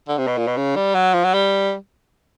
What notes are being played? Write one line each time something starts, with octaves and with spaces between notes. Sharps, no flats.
D3
C3
B2
A#2
B2
C#3
G3
F#3
F3
F#3
G3